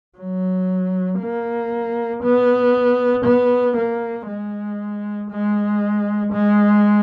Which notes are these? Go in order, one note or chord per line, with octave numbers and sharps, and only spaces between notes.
F#3
A#3
B3
B3
A#3
G#3
G#3
G#3